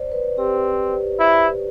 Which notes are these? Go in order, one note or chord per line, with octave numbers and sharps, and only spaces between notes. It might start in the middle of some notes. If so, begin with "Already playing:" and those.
Already playing: C5 D5
B4
C4 G4
E4